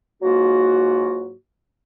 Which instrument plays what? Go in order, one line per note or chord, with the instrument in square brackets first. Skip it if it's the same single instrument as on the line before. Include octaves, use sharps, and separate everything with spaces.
[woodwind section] G#2 F#3 A#3 F4 F#4